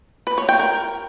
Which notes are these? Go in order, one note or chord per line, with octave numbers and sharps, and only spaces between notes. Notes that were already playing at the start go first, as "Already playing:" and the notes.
B4
C#5
G5
A#4